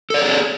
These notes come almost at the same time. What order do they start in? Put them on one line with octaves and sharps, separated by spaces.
A4 D5 C#5 G#4